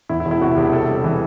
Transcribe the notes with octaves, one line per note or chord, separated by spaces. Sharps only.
E2 E4
E4
E1
E4
C3 F#4
E1 G4
C3 A4
G3
E3